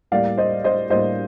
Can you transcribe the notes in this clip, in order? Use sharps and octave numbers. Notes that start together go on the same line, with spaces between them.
A2 G3 A#3 D5 F5
C5 D#5
C5 D#5
A2 G3 A#3 C5 D#5